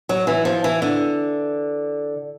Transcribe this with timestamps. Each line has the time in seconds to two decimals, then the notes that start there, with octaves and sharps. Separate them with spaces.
0.09 F#3
0.27 E3
0.45 F3
0.64 E3
0.82 D3